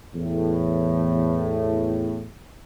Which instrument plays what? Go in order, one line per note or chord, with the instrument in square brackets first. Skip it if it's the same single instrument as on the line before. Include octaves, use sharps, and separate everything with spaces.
[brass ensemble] E2 A2